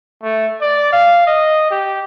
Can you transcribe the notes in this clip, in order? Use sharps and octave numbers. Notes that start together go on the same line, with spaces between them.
A3
D5
F5
D#5
G4